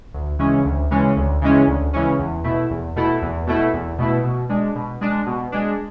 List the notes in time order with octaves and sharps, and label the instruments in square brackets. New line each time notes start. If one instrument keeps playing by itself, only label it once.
[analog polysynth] D2
C#3 E3 G#3 C#4
D2
C#3 E3 G#3 C#4
D2
C#3 E3 G#3 C#4
D2
C#3 E3 G#3 C#4
E2
B2 A3 E4
E2
B2 A3 E4
E2
B2 A3 E4
E2
B2 A3 E4
B2
G#3 D4
B2
G#3 D4
B2
G#3 D4